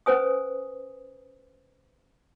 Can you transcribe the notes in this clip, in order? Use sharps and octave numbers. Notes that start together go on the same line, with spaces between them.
C#4 B4 C5 G#5 D#6